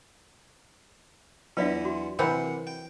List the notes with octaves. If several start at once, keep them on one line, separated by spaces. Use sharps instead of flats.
E2 E3 F#3 B3 D4 F4 D5 E5
F#4 C6
C3 E3 A#3 C4 C5 F#5
G5